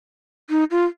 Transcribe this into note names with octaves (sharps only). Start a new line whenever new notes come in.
D#4
F4